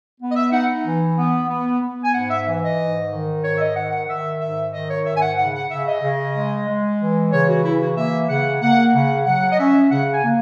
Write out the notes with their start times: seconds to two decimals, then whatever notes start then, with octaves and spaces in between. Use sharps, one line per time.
0.20 B3
0.31 D#5
0.35 E5
0.52 D#4 F#5
0.84 E3
1.17 B3
1.49 B3
1.81 B3
2.03 G#5
2.13 G#2 F#5
2.30 E5
2.46 E3
2.63 D#5
2.79 G#2
3.11 D#3
3.43 G#2 C#5
3.56 E5
3.60 D#5
3.76 D#3 F#5
3.92 F#5
4.08 D#3 E5
4.41 G#2 E5
4.73 D#3 D#5
4.89 C#5
5.05 G#2 E5
5.16 G#5
5.22 F#5
5.38 C#3 F#5
5.54 F#5
5.70 C#3 E5
5.86 D#5
6.03 C#3
6.35 G#3
6.67 G#3
7.00 E3
7.32 C#3 C#5
7.48 F#4
7.64 E3 E4
7.80 F#4
7.97 A#3 E5
8.29 C#3 F#5
8.61 A#3 F#5
8.94 C#3 F#5
9.26 F#3 F#5
9.51 D#5
9.59 C#4 E5
9.90 C#3 F#5
10.13 G#5
10.24 A#3